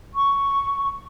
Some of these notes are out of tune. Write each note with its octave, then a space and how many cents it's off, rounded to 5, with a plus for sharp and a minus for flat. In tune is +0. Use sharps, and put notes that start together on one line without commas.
C#6 +5